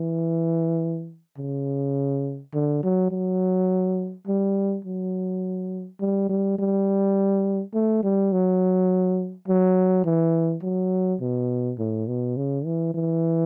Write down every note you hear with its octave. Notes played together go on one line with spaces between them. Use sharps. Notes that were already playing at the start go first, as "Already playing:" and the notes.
Already playing: E3
C#3
D3
F#3
F#3
G3
F#3
G3
G3
G3
A3
G3
F#3
F#3
E3
F#3
B2
A2
B2
C#3
E3
E3